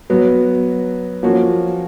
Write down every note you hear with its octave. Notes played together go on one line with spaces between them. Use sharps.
F#3 B3 F#4
F3 A#3 C#4 F#4